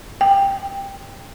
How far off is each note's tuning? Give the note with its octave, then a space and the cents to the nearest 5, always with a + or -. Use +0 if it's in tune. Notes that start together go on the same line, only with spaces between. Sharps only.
G5 +10